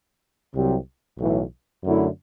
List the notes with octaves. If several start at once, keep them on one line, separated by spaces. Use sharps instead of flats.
C2 C3 F#3 C4 G4
B1 A2 E3
F#2 D3 A3 E4